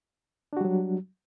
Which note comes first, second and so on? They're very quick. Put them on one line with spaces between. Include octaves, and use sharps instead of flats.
D4 F#4 G3 F#3